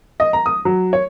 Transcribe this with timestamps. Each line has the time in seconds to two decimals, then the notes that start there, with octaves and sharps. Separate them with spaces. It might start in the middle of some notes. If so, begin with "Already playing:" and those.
0.20 D#5
0.33 A#5
0.46 D#6
0.65 F#3
0.93 C#5